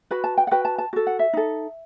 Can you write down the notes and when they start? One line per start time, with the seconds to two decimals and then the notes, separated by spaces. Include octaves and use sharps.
0.11 F#4 B4 B5
0.24 A5
0.37 G5
0.47 F#5
0.51 F#4 B4 G5
0.65 A5
0.78 A5
0.93 F#4 A4
1.07 F#5
1.19 E5
1.33 D#4 A4